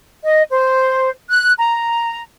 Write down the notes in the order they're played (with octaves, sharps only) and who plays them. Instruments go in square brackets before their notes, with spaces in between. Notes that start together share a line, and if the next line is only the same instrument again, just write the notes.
[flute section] D#5
C5
F#6
A#5